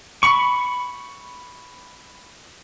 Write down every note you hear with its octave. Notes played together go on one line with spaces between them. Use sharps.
B5 C#6